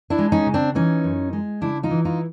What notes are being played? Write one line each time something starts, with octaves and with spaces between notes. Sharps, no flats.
D4 E4
G#3
C#4 D#4
C#3
C4 D4
E3 C#4 D#4
F#2
G#3
C#3 D4 E4
D#4 F4
E3
D#4 F4